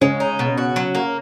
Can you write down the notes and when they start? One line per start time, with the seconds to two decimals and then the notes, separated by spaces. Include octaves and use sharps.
0.01 C#3 G#3 C#4
0.20 D#4
0.39 B2
0.58 F#4
0.76 F#3
0.95 A#3